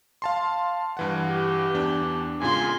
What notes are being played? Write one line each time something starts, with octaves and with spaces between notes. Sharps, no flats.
F5 A5 C6
G2 E3 F#5
G4
E2 D4
G#2 C#3 F4 G#5 C6